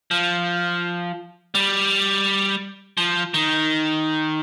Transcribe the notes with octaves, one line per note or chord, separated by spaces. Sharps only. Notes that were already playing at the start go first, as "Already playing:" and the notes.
F3
G3
F3
D#3